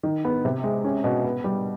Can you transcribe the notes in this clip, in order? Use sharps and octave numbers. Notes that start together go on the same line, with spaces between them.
D#3
B3
C3
G#3
C#4
B2
B3
G3